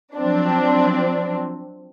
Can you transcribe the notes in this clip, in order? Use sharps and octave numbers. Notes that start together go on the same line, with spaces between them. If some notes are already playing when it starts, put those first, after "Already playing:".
F3 F#3 C4 D4